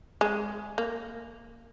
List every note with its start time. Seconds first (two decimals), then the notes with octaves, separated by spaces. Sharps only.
0.21 G#3
0.78 A#3